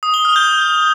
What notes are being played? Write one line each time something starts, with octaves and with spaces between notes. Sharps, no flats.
D#6
G7
F6
G6